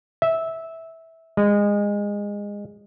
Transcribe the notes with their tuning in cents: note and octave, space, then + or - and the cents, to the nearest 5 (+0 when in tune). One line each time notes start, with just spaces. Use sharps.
E5 -15
G#3 -20